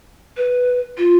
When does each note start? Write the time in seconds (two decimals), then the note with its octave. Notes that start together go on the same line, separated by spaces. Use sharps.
0.37 B4
0.98 F4